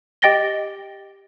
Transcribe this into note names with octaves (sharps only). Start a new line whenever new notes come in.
G4 D#5 G5 A6 A#6 G7